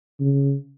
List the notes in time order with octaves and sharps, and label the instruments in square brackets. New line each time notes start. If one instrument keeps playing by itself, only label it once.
[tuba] C#3